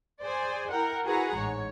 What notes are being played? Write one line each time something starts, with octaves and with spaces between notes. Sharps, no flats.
G#4 C5 D5 G#5
E4 A#4 F#5 G5
E4 F#4 G#4 B4 F#5 A#5
A1 G#2 C#5